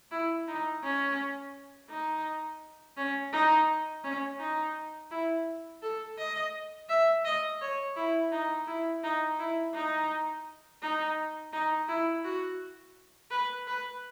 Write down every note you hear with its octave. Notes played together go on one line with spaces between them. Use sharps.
E4
D#4
C#4
D#4
C#4
D#4
C#4
D#4
E4
A4
D#5
E5
D#5
C#5
E4
D#4
E4
D#4
E4
D#4
D#4
D#4
E4
F#4
B4
B4